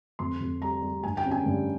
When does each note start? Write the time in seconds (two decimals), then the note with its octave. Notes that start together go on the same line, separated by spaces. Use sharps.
0.19 F2 C6
0.41 F2
0.62 G3 A#5
0.83 G3
1.03 G2 G#5
1.17 G5
1.25 C#4
1.31 G#5
1.46 G2